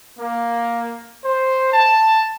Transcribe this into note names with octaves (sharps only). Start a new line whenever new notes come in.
A#3
C5
A5